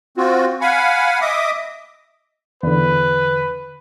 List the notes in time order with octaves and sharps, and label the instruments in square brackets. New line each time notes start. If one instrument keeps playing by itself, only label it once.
[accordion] C4 F4 F#4
F5 F#5 G#5 B5
D#5 E5 D6 D#6
[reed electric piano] E2 D3 [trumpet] B4